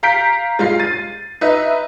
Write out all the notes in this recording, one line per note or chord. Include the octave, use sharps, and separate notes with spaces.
F5 A#5 G6 B6 D7
G#3 F4 C7
A6 D#7
D#4 B4 E5